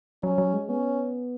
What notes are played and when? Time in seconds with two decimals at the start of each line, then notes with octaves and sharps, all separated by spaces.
0.23 F#3 C#4
0.38 F#3
0.53 G#3
0.69 B3 C#4